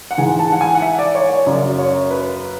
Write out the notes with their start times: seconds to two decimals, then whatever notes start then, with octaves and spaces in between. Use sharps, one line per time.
0.11 F#5
0.18 G#2 E3 G#5
0.39 A5
0.52 F#5
0.61 G#5
0.75 F#5
0.82 E5
0.99 D5
1.15 C#5
1.30 C#5
1.46 F#2 C#3 F#3 D5
1.79 C#5
2.11 B4